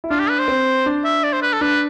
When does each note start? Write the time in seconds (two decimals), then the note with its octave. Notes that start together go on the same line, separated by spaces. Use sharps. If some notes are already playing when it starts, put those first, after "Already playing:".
0.04 E4
0.10 D4 F4
0.20 G4
0.29 B4
0.39 C5
0.48 C4
0.86 D4
1.05 E5
1.23 D5
1.33 C5
1.42 B4
1.53 A4
1.61 D4 B4